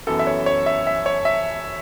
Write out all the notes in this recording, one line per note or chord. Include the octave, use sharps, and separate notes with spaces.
F#2 E3 B3 A4
E5
C#5
C#5
E5
E5
C#5
E5